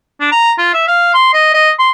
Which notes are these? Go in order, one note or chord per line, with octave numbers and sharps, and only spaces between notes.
D4
A#5
F4
E5
F5
C6
D#5
D#5
C6